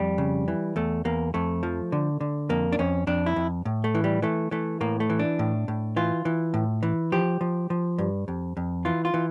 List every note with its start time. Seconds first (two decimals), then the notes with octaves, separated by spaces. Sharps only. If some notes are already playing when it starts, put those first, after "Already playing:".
Already playing: F2 G3
0.18 C#3
0.48 E3
0.76 E2 A3
1.05 E2 A#3
1.34 F2 A3
1.63 F3
1.92 D3
2.21 D3
2.49 F2 A#3
2.72 D4
2.79 F2 C#4
3.07 F2 D4
3.26 E4
3.36 F2
3.65 A2
3.84 A3
3.95 E3
4.04 G3
4.22 E3 A3
4.51 E3 A3
4.81 A2 A#3
5.00 A3
5.10 E3
5.19 D4
5.39 A2
5.68 A2
5.96 E3 F4
6.25 E3
6.54 A2
6.83 E3
7.12 F3 G4
7.41 F3
7.70 F3
7.98 G2
8.28 F2
8.57 F2
8.85 E3 F4
9.05 F4
9.14 E3